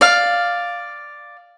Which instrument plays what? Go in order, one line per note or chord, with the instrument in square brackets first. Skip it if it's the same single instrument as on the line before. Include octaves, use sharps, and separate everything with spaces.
[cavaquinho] D5 F5